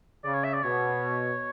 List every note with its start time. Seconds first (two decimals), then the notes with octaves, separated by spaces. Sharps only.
0.24 C#3 D5
0.34 C#5
0.44 E5
0.54 D5
0.63 B2 C#5